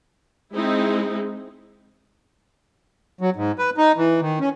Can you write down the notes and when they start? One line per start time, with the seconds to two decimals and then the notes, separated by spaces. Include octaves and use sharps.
0.54 G#3 C4 D#4 E4
3.21 F#3
3.36 G#2
3.59 B4
3.77 D#4
3.97 E3
4.21 D#3
4.40 C#4